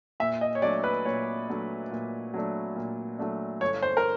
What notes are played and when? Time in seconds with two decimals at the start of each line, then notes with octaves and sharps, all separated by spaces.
0.20 A#2 E5
0.41 D#5
0.55 C#5
0.62 F#3 A3 D4 D5
0.84 B4
1.05 A#2 C#5
1.48 F#3 A3 D4
1.91 A#2
2.34 F#3 A3 D4
2.76 A#2
3.19 F#3 A3 D4
3.61 G1 C#5
3.82 C5
3.97 A#4